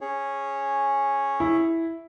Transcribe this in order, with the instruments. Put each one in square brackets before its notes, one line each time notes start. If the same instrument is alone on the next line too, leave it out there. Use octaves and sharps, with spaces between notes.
[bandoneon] C#4 G#4 C#5
[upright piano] E4